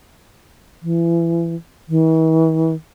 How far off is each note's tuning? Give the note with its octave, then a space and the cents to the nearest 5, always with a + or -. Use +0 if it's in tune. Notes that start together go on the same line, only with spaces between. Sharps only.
E3 +30
E3 -45